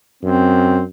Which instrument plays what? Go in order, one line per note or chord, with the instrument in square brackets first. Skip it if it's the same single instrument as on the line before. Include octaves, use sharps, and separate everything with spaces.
[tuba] F#2 [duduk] C4